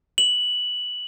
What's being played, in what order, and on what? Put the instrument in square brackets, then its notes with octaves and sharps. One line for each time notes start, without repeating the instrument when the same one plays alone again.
[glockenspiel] F#7